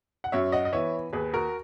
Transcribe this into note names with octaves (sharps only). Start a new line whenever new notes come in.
F#5
F#2 C#5 E5
D#5 F#5
D#5
E3 B3 C#5 E5
D#2 G#4 B4
F#4 A#4